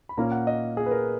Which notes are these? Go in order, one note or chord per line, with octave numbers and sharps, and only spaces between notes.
B5
A#2 A#3 C#4 A#5
F#5
D#5
G#4
B4
A#4